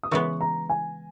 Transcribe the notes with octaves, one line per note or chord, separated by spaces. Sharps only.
D#6
C#3 E3 G#3 B3 C#6
A#5
G#5